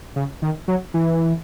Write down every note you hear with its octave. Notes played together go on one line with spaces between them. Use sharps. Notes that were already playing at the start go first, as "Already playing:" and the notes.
C#3
D#3
F#3
E3